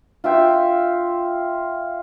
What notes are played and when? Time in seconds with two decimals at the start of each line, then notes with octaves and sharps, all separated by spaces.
0.24 F4 E5 G5